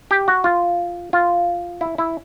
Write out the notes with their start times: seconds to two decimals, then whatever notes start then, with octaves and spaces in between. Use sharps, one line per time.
0.11 G4
0.28 F#4
0.44 F4
1.13 F4
1.81 E4
1.98 E4